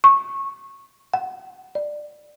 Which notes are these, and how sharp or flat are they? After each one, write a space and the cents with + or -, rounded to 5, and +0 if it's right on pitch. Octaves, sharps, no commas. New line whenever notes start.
C#6 -15
F#5 +15
D5 +15